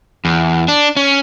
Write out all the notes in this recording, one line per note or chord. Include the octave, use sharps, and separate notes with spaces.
E2
D4
C#4